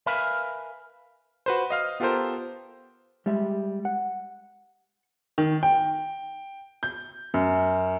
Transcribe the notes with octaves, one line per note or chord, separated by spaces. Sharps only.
A#4 B4 E5 F5 G#5 B5
F#4 B4 C5
D#5 F5 F6
B3 F4 G4 A4 A#4 C5
G3 G#3 G4 E5
F#5
D#3
G5
G6
F#2